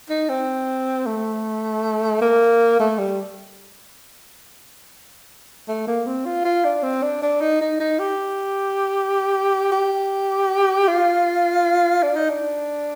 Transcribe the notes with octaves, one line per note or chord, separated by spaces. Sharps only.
D#4
C4
A3
A#3
A3
G3
A3
A#3
C4
F4
F4
D4
C4
D4
D4
D#4
D#4
D#4
G4
G4
F4
D4
D#4
D4